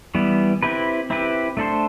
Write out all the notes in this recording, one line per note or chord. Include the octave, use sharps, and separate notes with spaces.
E3 G3 B3
C4 E4 G4 B4
C4 E4 G4 B4
A3 D4 A4 C5